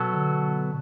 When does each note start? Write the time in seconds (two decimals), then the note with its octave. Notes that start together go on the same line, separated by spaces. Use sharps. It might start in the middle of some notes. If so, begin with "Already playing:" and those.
Already playing: B2 F#3 B3 F#4 A4
0.14 D3